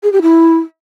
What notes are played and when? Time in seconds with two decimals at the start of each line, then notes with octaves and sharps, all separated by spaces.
0.03 G#4
0.13 G4
0.22 E4